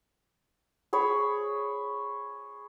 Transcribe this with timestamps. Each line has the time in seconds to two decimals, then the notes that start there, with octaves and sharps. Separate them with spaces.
0.93 G#4 C#5 B5